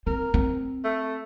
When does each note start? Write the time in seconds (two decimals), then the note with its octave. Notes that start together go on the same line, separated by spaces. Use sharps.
0.07 C4 A#4
0.34 C4
0.84 A3